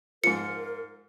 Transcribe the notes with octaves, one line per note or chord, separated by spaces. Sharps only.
G#2 F3 A#4 C#7